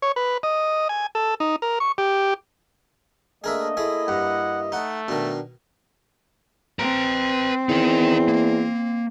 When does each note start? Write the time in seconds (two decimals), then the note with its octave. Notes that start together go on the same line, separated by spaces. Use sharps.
0.02 C#5
0.16 B4
0.43 D#5
0.89 G#5
1.15 A4
1.40 D#4
1.62 A#4
1.80 C#6
1.98 G4
3.44 A3 A#3 D4 G#4 A#4 D#5 E5
3.77 A3 A#3 E4 G#4
4.08 G2 F#5
4.72 A3 D#4 F#5
5.08 B2 D#3 D4
6.79 C4 B4 A#5
7.69 E2 D#4 A#4
8.28 A#3